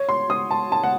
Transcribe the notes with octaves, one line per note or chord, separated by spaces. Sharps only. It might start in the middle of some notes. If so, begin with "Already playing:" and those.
Already playing: C#5
C6
D#6
A5
A5
F#5